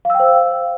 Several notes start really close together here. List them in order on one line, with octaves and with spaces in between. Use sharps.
F5 E6 G5 C5